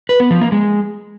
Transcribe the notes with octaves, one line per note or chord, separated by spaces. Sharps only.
B4
B3
F3
A#3
G#3